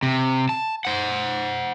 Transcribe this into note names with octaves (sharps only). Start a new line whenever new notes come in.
C3
A5
C5 F#5